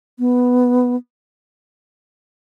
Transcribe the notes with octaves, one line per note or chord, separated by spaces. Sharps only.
B3